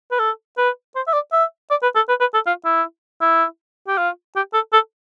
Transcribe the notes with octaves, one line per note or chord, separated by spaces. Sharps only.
B4
A4
B4
C5
E5
D5
E5
D5
B4
A4
B4
B4
A4
F4
E4
E4
G4
F4
G4
A4
A4